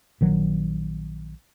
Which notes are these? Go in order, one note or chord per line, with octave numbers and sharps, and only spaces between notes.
A#1 D#3 F#3